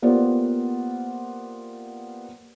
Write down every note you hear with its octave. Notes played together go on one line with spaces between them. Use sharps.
A#3 B3 F4 G4 C5 D5